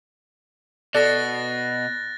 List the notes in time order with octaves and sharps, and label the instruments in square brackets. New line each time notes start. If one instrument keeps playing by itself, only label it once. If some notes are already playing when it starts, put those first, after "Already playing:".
[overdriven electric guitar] B2 [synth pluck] A4 D5 [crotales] F#6 A6 A#6